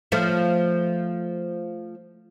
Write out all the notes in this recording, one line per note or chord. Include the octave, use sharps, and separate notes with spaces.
F3 A3